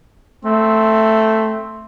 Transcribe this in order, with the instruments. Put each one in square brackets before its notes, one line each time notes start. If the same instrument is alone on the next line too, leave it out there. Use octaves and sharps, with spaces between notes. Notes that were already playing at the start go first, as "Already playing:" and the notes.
[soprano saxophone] A3 [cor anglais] C4